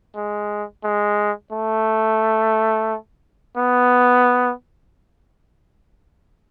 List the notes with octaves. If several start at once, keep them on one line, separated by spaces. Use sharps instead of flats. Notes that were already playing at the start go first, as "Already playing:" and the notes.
G#3
G#3
A3
B3